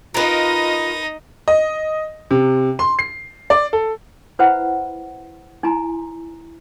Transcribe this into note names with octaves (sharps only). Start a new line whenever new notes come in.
D#4 F4 A#4 B4 D#5
D#5
C3
C6
C7
D5
A4
E4 B4 C5 E5 F#5 B5
D#4 E4 G#5 A#5 C6